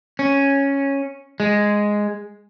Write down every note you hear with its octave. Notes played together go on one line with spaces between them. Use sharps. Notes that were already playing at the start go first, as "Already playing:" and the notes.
C#4
G#3